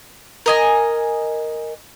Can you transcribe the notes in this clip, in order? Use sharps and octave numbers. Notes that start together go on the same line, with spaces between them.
A#4 D#5 G#5